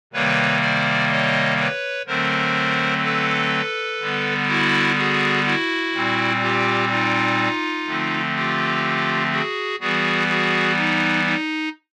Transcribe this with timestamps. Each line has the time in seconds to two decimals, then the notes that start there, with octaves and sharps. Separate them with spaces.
0.13 C3 D#3 G3 A#3 B4 C#5
0.61 C5 D5
1.10 C#5 D#5
1.59 B4 C#5
2.07 D3 F#3 A3 C4 A#4 C5
3.03 A4 B4
4.00 D3 G3 B3
4.48 E4 F#4
4.97 F#4 G#4
5.45 E4 F#4
5.94 A#2 G3 C4
6.41 F4 G4
6.90 D#4 F4
7.87 D3 F3 A3 C4
8.35 F4 G4
9.32 F#4 G#4
9.80 E3 G3 B3 F#4 G#4
10.29 F#4 G#4
10.77 D#4
11.26 D#4